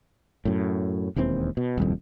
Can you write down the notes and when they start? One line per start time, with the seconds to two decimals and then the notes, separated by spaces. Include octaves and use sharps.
0.45 F#2 A2
1.16 E1 D#2 E3 C4
1.57 B2
1.77 D#1 C2 F2